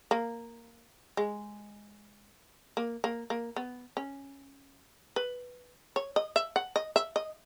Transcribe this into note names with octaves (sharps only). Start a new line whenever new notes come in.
A#3
G#3
A#3
A#3
A#3
B3
C#4
B4
C#5
D#5
E5
F#5
D#5
E5
D#5